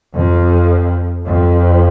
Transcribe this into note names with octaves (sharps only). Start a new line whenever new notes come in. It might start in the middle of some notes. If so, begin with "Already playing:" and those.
F2
F2